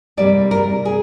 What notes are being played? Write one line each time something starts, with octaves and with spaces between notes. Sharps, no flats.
C3 G3 A#3 D5
A#4
G#4